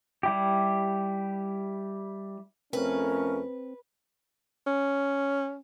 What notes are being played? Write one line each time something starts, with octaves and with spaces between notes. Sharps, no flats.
G3 E4 G4
F2 A3 C4 C#4 A#4 B4
C#4